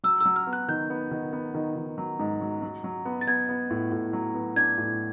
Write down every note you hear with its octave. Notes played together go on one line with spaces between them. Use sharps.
F#3 E6
E6
F#3
F6
B3
F#6
D#3 G6
B3
D#3
B3
D#3
D#3
F#3
G#2
F#3
F#3
F#3
B3
A6
B3 G#6
B3
A2
A2
F#3
B3
D4 G#6
A2